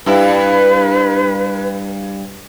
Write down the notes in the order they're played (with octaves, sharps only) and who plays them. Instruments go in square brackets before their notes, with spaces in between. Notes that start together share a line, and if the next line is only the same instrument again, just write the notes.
[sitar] G2 E4 [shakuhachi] B4